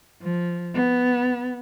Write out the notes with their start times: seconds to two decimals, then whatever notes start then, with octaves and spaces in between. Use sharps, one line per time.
0.21 F3
0.75 B3